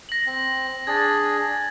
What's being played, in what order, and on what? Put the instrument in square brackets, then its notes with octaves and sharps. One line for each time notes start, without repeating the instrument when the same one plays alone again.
[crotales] A#6 F#7
[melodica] C4
[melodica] D4 G#4 [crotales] G#6 A6